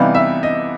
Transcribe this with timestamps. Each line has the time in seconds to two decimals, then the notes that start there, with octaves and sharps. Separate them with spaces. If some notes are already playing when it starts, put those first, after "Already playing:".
Already playing: C3 E3 G3 B3 D#4 F5
0.15 E5
0.43 D#5